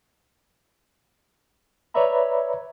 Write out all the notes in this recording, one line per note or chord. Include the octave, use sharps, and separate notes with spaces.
B4 C#5 D5 E5 A#5 B5